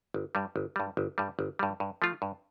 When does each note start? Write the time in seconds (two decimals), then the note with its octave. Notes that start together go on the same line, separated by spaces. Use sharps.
0.14 G1
0.35 G2 G3
0.56 G1
0.76 G2 G3
0.97 G1
1.18 G2 G3
1.39 G1
1.59 G2 G3
1.80 G2
2.02 F3 A3 F4
2.22 G2